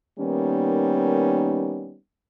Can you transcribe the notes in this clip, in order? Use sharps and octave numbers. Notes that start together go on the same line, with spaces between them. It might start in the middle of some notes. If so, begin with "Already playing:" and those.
D#3 G3 A#3 B3 C#4 D#4